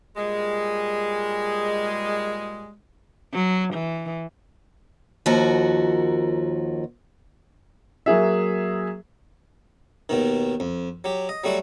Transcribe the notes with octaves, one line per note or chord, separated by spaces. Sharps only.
A#2 G3 G#3
F#3
E3
D#2 F3 F#4 A#4 F#5
F#3 A#3 G#4 E5
D#2 B2 D#3
F2
F#3 G4
D#5
F#3 G3 A3 F#4